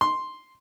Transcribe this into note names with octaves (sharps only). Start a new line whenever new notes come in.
C6